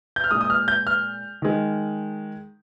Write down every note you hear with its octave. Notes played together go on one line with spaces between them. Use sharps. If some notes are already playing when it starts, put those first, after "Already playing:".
G6
F6
A#2 G#3 D#6
D#6
F6
G6
F6
D#3 G#3